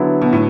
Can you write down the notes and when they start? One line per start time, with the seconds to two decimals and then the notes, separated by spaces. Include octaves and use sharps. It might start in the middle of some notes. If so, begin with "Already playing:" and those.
Already playing: D3 F#3 B3 E4
0.22 B2
0.33 A2